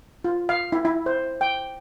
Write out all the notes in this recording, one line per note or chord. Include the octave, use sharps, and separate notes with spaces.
F4
F5
E4
E4
C5
G5